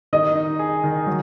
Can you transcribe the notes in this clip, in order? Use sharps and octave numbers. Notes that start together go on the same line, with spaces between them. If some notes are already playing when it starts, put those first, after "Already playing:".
D#3 D#5
D#4
G#4
D#3
F#3